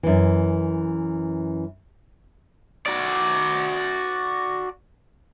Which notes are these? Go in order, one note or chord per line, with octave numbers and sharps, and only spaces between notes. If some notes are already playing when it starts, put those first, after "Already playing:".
F#2 E3
F#4 D5